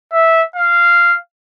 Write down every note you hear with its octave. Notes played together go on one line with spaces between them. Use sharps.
E5
F5